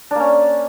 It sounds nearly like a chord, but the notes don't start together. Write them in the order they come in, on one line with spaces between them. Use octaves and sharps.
D4 A#3 C#4